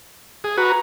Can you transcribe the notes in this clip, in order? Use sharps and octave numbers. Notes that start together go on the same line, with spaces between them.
G#4
F#4 B4 A#5